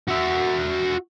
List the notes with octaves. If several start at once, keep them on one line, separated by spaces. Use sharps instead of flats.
F#4 E5